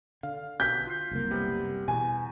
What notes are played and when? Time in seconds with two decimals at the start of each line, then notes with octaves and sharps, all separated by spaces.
0.23 D3 F5
0.60 B2 G6 B6
0.87 F4 C7
1.11 F#1 C2 A#3
1.31 C3 G3 B3
1.88 E2 B2 G#5